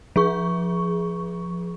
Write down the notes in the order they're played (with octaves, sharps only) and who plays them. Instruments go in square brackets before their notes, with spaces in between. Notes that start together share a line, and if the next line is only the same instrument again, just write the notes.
[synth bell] F3 G#4 C#6